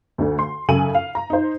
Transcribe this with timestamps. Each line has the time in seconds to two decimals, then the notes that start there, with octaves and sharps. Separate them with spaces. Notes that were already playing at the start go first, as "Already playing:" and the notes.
0.18 D2 D3
0.39 C6
0.68 F#2 C#3 A4 G#5 D#7 F#7
0.95 F5
1.15 A#5
1.30 D#4 C5